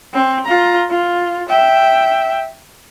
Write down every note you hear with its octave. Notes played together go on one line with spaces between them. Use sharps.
C4
F4 A#5
F4
E5 G5